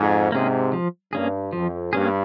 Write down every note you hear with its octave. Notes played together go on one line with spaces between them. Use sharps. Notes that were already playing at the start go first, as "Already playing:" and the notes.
Already playing: F2 G#2
G#2 C3 A#3 C#4 G#4
F3
G2 A#3 C#4 G#4
F2 F3
G2 A#3 C#4 G#4